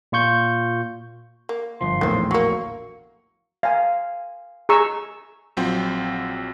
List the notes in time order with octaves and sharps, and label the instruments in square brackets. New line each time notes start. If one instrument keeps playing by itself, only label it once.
[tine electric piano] A#2 F4 C#6 G6
[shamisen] A#3
[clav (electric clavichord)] G1 F3 [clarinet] C6
[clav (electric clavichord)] A#1 E2 A2 [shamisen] D#3 C4
[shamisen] F#3 A#3 [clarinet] C#6
[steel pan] F5 G#5
G#4 A#5 C#6 E6
[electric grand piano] A#1 F#3 C4 F4 G5